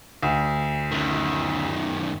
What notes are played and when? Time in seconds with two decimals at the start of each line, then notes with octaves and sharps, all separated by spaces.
0.23 D2
0.91 F#2 D#3